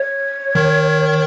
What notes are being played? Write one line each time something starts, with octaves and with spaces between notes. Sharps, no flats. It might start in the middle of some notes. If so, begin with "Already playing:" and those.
Already playing: C#5
D#3